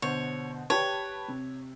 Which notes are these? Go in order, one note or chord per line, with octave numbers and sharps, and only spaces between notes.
B2 D3 C5 C#5
G4 B4 C#5 A5
C3